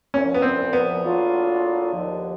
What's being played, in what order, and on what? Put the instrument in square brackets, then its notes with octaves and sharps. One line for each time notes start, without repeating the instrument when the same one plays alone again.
[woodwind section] C2 A#2 F3 [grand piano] C#4
[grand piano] B3
C4
B3
[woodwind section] A2 F#3 A#3 D4 F4
D#2 D3 F3